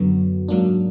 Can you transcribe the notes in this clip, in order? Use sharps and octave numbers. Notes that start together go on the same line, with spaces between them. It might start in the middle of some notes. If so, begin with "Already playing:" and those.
Already playing: F#2 D3 F#3 B3
G#2 F#3 A#3 D4